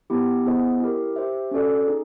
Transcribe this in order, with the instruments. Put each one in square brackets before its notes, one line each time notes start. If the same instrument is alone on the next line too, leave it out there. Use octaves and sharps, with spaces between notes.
[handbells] B3 E4 G4
B3 E4 G#4 C5 D#5
E4 G4 A#4
G4 C5 E5
C#4 F#4 A4 D5
D#4 G#4